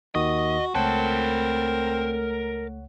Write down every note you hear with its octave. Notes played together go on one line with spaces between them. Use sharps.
D#2 D#3 F#4 D#5 D#6
C#2 A3 C4 A#4 C#5 F#5 A5